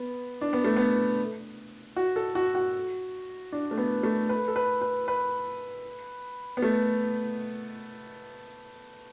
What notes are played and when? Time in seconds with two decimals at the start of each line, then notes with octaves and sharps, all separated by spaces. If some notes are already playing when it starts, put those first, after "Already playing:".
Already playing: B3
0.41 D4
0.53 B3
0.64 A3
0.77 B3
1.96 F#4
2.16 A4
2.35 F#4
2.55 F#4
3.52 D4
3.71 A3
3.78 B3
4.03 A3
4.29 B4
4.48 A4
4.56 B4
4.81 B4
5.08 B4
6.57 B3
6.62 A3